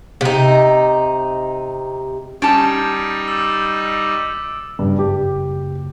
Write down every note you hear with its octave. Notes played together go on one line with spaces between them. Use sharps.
C3 D#4
G3 C#4 D#4 G4 A5 A6 D7
D6 E6
F#1 G2
G4